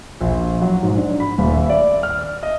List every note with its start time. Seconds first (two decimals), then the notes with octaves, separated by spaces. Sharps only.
0.21 A#1
0.61 F#3
0.83 G#2
0.97 D4
1.20 B5
1.38 D#1
1.53 E5
1.70 D5
2.03 F6
2.43 D#5